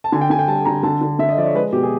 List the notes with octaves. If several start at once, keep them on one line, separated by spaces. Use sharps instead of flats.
A5
D3 G#5
G5
D3 G#5
G5
G3 A5
D3 A#5
D3 A5
D3
D3 E5
D#5
F3 D5
C#5
G#3 B4
B2 G4
G#4